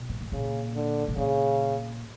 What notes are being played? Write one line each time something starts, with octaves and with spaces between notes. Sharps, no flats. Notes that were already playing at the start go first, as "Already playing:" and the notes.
Already playing: B2
G#2
A2
A#2 C#3
D3
B2
A#2 C#3